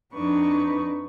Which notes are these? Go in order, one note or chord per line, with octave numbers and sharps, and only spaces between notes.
F2 D4 D#4 B4 C#6